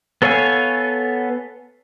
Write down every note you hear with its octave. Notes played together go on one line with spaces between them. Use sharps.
B3 A4 C#5 F5 G#5